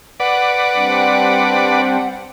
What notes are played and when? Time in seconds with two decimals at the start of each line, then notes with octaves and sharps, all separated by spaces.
0.20 B4 D5 F#5
0.75 G3 C4 D4